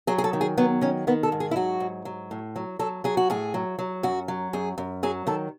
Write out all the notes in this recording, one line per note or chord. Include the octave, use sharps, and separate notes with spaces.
F#3 G#4
G#4
A4
D#3
G#4
F#3 B3
D#3 C#4
D#3 B3
A4
G#2
G#4
E4
F#3 F#4
G#2
F#3
A2
F#3
F#3 A4
F#3 G#4
F#4
A2 G#4
F#3
F#3
F#2 F#4
F#3
F#2 G#4
F#2
F#3 G#4
D#3 A4